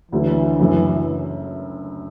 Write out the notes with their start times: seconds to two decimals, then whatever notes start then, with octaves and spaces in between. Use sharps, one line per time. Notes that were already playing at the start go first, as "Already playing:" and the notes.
0.11 D2 D3 E3 F#3
0.60 F#1 F#2 F#3 A3